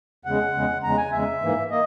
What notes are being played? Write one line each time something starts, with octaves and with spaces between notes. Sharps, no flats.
E2 C#3 G#3 F#5
E2 C#3 G#3
E2 C#3 G#3 A#5
G#5
E2 C#3 G#3 E5
G#2 E3 A#3
A#3 D#5